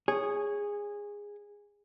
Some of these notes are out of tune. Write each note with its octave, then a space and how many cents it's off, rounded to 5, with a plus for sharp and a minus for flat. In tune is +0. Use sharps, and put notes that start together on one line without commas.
G#4 -15 C#5 +0